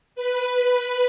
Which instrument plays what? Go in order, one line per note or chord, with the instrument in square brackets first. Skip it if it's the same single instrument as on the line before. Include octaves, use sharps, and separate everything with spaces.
[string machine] B4